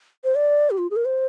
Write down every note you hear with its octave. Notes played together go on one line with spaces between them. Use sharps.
C5
D5
G4
F4
G#4
A#4
C5